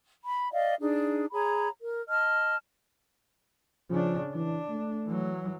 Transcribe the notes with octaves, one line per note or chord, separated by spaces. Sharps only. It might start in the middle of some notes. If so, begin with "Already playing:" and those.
B5
D5 D#5 F5
D4 D#4 G#4
G#4 C#5 A#5 B5
A#4
D#5 A5 F6
C#3 F3 D4
E3 D4
A3
E3 F#3